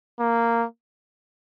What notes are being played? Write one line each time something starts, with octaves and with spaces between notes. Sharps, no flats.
A#3